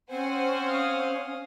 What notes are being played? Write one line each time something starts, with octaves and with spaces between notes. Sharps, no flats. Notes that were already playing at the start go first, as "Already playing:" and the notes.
C4 C#4 C5 F#5 G#5
F5 D#6